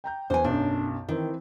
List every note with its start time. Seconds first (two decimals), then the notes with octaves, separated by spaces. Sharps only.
0.04 G5 A#5 G6
0.30 E2 B4 C5 G#5
0.44 B1 F#2 D4
1.08 D#3 E3 C4